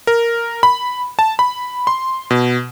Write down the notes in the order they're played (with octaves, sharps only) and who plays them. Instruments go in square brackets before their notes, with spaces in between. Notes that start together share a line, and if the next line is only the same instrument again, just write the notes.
[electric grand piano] A#4
B5
A5
B5
C6
B2